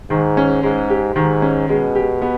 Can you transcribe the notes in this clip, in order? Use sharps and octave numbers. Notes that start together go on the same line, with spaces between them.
G#2 D#3
C#4
G#2 G#3
G4
G#2 D#3
C#4
B2 G#3
G4
B3